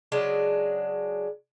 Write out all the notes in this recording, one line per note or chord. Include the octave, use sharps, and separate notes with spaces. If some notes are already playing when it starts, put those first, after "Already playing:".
C#3 F#3 G#3 D4